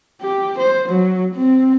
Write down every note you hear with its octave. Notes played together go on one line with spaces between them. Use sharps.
G4
C5
F#3
C4